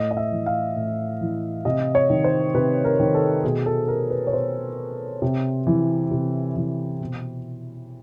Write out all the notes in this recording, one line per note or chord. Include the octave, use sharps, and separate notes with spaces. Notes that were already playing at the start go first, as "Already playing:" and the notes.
Already playing: A2 D#5
D#5
E5
E3
F5
A2
E3
C3 D#5
C#5
D#3
C5
C3 B4
A#4
D#3
A4
B2 G#4
A4
A#4
B4
C#5
B2 C5
C3
E3
C3
E3
B2